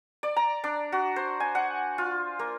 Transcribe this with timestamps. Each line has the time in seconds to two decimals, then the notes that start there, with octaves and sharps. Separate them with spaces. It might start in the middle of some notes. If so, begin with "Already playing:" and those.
0.23 D5
0.36 A#5
0.64 D4
0.92 F#4
1.16 C5
1.40 G#5
1.55 F#5
1.98 F4
2.39 A#3